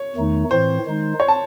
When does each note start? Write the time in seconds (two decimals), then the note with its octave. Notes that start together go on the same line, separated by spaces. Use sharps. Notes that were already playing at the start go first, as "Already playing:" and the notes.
Already playing: C#5
0.16 E2 D#3 A3 D#4
0.51 A2 E3 C4 C5
0.86 D#3 G#3 D#4
1.20 C#5
1.28 A5